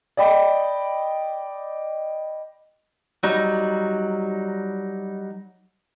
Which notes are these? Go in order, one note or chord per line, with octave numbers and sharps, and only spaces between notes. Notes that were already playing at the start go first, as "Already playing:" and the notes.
D5 D#5 G5 B5
F#3 G3 D#4